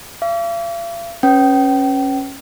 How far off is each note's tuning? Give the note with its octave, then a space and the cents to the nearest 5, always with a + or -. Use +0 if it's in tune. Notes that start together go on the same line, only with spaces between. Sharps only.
F5 -45 D6 -40
C#4 -15 B4 +5 G5 -35